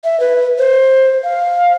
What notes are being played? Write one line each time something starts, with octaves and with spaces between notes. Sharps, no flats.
E5
B4
C5
F5